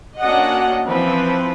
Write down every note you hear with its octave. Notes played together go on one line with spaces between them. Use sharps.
A#3 C#4 D4 F#4 D#5 F#5
E3 F3 C4 B4